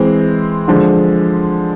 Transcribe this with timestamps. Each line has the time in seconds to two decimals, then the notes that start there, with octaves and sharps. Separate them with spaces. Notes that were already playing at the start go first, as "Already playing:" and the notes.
Already playing: E3 G#3 C4
0.68 D3 F3 G#3